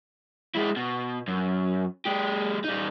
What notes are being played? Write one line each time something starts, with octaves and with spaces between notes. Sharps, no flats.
G#3 E4
B2
F#2
G#3 G4
G3 D#4